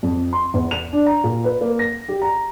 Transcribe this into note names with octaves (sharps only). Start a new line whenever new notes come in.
F2
C6
E2
F7
D4
A#5
A#2
B4
A#3
A#6
G4
A#5